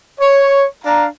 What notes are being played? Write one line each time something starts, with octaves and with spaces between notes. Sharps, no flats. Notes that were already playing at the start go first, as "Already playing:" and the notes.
C#5
D4 F5 A#5